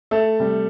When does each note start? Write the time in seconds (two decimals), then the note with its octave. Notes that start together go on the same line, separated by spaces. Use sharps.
0.11 A3 A4
0.40 C3 G3